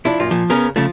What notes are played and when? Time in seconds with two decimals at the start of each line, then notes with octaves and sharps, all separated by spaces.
0.05 F3 D4 E4
0.20 F#2 A#2 F4
0.31 A#2 F3
0.50 C#3 B3 C#4 A#4
0.76 C#3 F3 A3